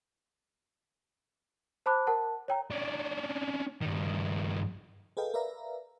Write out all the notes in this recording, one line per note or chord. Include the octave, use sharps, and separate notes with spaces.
C5 A5 B5 D6 F#6
A#4 F#5 A5
C#5 G5 A#5
C#4 D4
G2 D#3
G#4 A4 B4 D#5 F5 G5
A#4 B4 D5 E5 F5 A#5